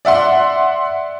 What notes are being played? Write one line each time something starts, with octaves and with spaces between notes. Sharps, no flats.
D5 E5 F#5 C6